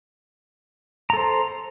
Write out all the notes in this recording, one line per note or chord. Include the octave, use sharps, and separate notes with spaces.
A4 C5 A#5